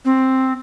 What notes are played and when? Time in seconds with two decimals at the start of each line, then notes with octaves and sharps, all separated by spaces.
0.05 C4